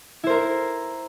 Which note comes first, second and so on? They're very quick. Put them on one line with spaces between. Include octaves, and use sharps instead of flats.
E4 C5 A#4